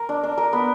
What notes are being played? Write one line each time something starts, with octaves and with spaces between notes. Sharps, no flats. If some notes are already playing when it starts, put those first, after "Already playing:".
Already playing: A#4
D4
D4
A#4
B3